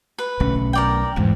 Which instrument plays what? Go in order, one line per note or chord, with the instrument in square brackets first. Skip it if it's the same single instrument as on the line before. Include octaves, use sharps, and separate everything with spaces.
[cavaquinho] B4
[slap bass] B1 A3 C#4 [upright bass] D3
[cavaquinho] A#4 D5 G5
[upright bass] E2 G#2